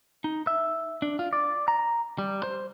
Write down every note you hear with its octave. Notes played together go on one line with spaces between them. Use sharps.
D#4
E5
D4
F4
D5
A#5
G3
C5